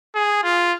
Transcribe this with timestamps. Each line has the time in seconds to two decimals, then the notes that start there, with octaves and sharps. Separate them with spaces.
0.15 G#4
0.43 F4